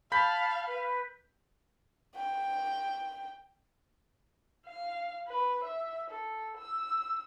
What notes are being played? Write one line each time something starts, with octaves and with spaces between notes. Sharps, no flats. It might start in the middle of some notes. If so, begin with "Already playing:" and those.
F5 A5 B5 G6 B6
B4
G5
F5
B4
E5
A4
E6